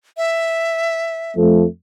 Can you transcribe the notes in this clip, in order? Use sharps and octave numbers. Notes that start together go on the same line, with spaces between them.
E5
F2 F3 A3